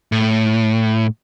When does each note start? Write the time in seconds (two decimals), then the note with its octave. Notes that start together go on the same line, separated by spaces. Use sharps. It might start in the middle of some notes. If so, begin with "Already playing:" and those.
0.12 A2